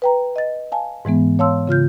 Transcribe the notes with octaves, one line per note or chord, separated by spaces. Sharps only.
B4 G5 A#5
D#5 A6
F5 G#5 A5
G#2 E3 G#3 B3
C#5 F5 A5 C6 E6
C#3 F4 F6 G6